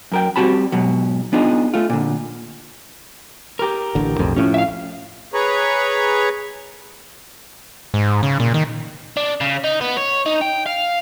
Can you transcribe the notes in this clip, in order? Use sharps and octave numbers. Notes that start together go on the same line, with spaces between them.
F#2 A#4 G5
G3 C4 F#4 A5 B5
G#2 B2 F#3
B3 D4 D#4 F4 G#4
A3 F4
A#2 D3
G4 A#4
A1 D3
B1 F2 A2
A2 F3 C#4
E5 F5
G#4 B4 C#5 A#5 B5 C#6
G#2
C#3
A#2
D#3
D4
C#3
D#4
B3
C#5
D#4
G5
F5